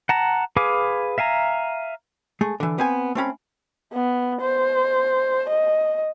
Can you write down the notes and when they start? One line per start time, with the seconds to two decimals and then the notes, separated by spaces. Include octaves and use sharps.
0.09 F#5 A5 A#5
0.56 G#4 B4 F5 G#5 D6
1.18 E5 F5 G#5 A#5
2.41 G#3 A3 G#4
2.60 D3 E3
2.78 B3 C4 G#5
3.15 A3 C4 C#4 B5
3.93 B3
4.41 C5
5.49 D#5